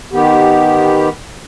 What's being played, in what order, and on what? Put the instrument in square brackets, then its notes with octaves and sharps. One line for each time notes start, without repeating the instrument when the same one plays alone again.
[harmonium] D#3 B3 G4